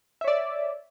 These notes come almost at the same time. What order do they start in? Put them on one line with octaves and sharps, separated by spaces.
E5 C#5 D5